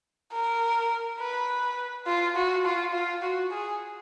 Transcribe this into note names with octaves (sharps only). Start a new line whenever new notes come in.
A#4
B4
F4
F#4
F4
F4
F#4
G#4